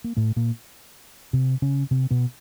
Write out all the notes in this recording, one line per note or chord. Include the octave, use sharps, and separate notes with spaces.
A#3
A2 A3
A#2 A#3
C3 C4
C#3 C#4
C3 C4
B2 B3